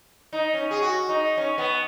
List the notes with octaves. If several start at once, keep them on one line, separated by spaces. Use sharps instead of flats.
D#4
C#4
G#4
F#4
D#4
C#4
B3